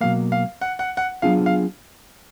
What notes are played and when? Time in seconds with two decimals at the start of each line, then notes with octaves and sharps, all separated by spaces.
0.01 B2 F#3 A#3 F5
0.32 F5
0.61 F#5
0.79 F#5
0.97 F#5
1.22 F#3 B3 D4 F4 G#4 F5
1.46 F5